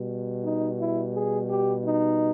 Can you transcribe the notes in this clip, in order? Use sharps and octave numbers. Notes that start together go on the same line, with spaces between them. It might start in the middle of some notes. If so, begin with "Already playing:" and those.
Already playing: B2 G3
D#4
E4
G#4
G4
D#4